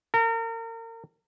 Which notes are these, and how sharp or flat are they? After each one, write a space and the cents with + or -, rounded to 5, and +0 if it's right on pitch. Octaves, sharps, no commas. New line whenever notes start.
A#4 -35